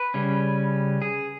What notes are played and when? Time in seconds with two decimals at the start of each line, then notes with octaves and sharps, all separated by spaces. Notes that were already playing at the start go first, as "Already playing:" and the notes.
Already playing: B4
0.14 C#3 G3 C#4
1.02 G#4